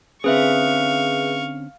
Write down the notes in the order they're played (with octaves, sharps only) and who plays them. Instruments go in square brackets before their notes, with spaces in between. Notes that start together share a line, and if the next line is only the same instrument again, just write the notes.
[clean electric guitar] D3 C4 C#4 [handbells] G#4 B4 E5 [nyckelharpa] F5 C#6